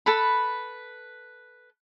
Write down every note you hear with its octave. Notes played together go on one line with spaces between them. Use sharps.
A4 B4 B5